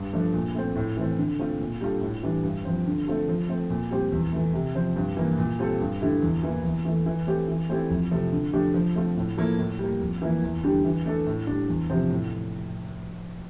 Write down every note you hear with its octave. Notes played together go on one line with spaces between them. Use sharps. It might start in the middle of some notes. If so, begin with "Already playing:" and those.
Already playing: G2
F3 A3 D4
A#2
A3 C4
A2
E3 A3 C4
D3
A3 C4 F4
A#2
G3 D4 F4 A4
A2
E3 G3 D4
G2
F3 C4
D3
A3 C4 F4 A4
F3
A3 C4
A#2
G3 C4 G4
E2
E3 A3
C3
F3 C4
G2
E3 A#3
A#2
G3 C4 F4 A4
G2
D3 A3 E4 G4
E2
E3 A#3 E4
E2
E3 A3
E3
A3 C4 G4
E3
A3 C4 E4 G4
F2
C3 F3 A3
D3
F3 A3 D4 G4
F3
A3 C4 F4 A4
A2
F3 A#3 E4 A4
A2
G3 A#3
F2
E3 A#3 E4
E2
D3 G3 D4 G4
E3
A3 D4 A4
A2
G3 D4
E2
C3 F3 C4
A2